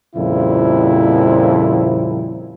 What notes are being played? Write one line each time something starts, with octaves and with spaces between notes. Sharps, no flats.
F2 A#2 C#3 F3 G3 E4